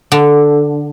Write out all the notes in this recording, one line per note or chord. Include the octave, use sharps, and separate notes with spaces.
D3